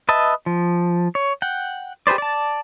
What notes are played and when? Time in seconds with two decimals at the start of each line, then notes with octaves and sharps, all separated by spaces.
0.09 B4 D#5 E5 A5
0.46 F3
1.15 C#5
1.42 F#5 G5
2.07 G4 G#4 B4 C5 D5
2.18 D5 A5